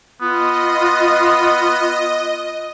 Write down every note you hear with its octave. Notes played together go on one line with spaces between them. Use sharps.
B3 F4 D#5